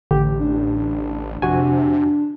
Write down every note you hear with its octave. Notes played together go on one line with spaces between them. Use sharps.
A1 D3 G4
D4
F2 C3 F#4 G#5